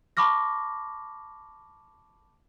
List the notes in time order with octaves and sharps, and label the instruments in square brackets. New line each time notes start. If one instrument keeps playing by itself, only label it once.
[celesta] A5 B5 C#6 D6 F6 A#6